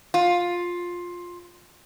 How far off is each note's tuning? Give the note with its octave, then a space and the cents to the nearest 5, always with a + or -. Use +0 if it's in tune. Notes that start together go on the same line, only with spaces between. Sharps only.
F4 +10